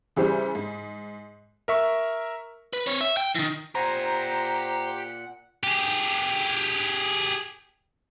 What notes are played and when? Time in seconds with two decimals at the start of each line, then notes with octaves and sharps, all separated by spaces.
0.16 C#3 E3 G3 C5
0.55 G#2
1.68 A#4 E5 C#6
2.73 B4
2.87 C4 C#5
3.01 E5
3.17 G5
3.35 D#3 E3
3.75 A#2 G4 C5 F#5 G#5 A#5
5.63 G4 G#4